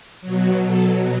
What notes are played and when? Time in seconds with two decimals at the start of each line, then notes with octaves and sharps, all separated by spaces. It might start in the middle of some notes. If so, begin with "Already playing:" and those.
0.21 B2 F#3
0.67 A4